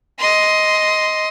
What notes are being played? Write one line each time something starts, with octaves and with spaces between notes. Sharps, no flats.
D#5 C6